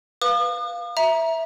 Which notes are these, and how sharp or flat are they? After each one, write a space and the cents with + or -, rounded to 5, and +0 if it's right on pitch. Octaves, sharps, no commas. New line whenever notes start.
B4 +0 F5 +0 D#6 -45
E5 -5 A#5 +20